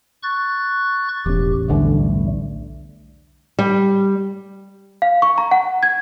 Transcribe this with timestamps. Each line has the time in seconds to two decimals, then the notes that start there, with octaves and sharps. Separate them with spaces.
0.23 C#6 F#6 A6
1.26 E1 E2 A2 C#4 G4
1.70 B1 D3 G3 A3
3.59 G3
5.02 F5
5.22 C#6
5.38 A#5
5.51 F#5
5.83 G#6